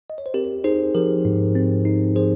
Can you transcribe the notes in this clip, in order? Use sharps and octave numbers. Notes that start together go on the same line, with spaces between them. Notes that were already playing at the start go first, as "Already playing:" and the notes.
D#5
C#5
C5
C4 G4 A#4
D#4 G#4 C5
F3 G4 A#4
G#2
C4
D#4
F3 G#4 C5